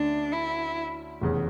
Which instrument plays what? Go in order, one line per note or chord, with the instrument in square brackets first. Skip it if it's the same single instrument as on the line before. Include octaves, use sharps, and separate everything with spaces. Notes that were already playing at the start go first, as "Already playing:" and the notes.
Already playing: [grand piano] D2 D3 A3 C#4 [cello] D4
[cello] E4
[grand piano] F1 E2 C#3